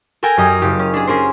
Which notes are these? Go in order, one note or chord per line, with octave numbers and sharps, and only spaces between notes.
A4 A#4 G5 G#5 A#5 G#6
F#2 G4 D#5 A#5
F#1 G4
C#4
D4 G#4
C#4 G#4 A#4 C5